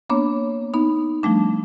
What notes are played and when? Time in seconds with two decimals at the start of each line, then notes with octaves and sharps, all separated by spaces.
0.10 A#3 B3 D4 C#5
0.74 B3 D#4
1.23 F3 G3 A3 D4